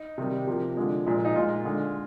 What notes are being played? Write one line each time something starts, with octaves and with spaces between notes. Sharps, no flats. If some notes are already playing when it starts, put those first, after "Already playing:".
Already playing: D#4
C3 D#3 G3
C3 F3 A#3
D3 F3 G#3
A#2 F3 G#3
D#4
A#2 G#3 F4
D3 G#3